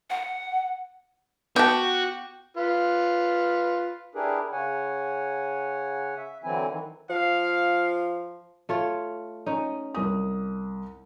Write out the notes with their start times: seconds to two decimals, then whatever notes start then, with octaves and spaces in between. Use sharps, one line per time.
0.10 F#5
1.56 B3 F#4 G4 A5
2.57 F4 B4
4.15 D4 E4 G4 G#4 A#4 B4
4.52 C#3 C#5 F#5 G#5
6.17 E5
6.44 D3 E3 F#3 C4 E4 G#5
6.67 D#3 E3
7.10 F3 F5
8.69 A3 F4 C#5
9.46 C#4 D#4
9.95 C2 D#6